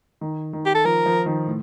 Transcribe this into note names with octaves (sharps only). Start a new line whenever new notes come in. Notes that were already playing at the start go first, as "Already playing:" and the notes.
D#3
D#3
G4
A4
F3 A#4
F3
D#3
A2